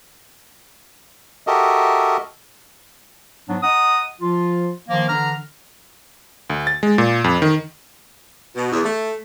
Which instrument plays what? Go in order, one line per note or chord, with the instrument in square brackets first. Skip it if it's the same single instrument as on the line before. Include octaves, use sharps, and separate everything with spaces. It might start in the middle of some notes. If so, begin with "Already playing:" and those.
[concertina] F#4 G4 A4 A#4 D#5 E5
[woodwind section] G#2 F#3 B3 D4
D#5 F#5 A#5 D#6
F3 F4
D#3 F3 A#3
D3 E3 D4 A#5 F6
[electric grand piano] D2
A6
G#3
A#2
F2
D#3
[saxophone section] B2
E2
A3